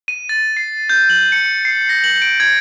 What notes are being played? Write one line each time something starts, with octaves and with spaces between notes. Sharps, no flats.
D#7
A6
C7
G6
F#7
C#7
C7
A#6
F#7
D7
G#6